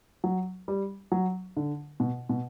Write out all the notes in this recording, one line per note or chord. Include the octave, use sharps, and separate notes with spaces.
F#3
G3
F#3
D3
B2
B2